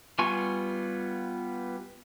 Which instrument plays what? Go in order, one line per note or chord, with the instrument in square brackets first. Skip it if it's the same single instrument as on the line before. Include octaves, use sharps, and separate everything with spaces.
[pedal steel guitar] G3 B3 F4 G#5 C#6